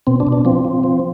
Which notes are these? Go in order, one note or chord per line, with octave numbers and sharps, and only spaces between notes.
B2 C4
D4
B2
D4
F3 C4
F3
F3